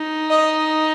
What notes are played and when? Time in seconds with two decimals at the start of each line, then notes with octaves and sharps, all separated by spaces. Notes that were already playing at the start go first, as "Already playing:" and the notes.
Already playing: D#4
0.30 D#5